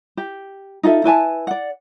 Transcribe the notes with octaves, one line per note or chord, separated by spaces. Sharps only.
G4
D#4 F4 A4 E5
E4 B4 G#5 A5
D5 F#5